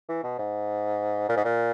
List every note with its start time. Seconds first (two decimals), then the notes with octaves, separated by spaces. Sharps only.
0.09 E3
0.24 B2
0.39 G#2
1.29 A#2
1.36 G#2
1.44 A#2